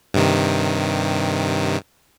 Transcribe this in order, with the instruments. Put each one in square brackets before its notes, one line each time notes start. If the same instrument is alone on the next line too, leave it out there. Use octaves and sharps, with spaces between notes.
[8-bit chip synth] G2 C3 D#3